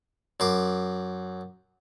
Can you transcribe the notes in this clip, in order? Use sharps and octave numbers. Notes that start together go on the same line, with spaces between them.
F#2 C6 D6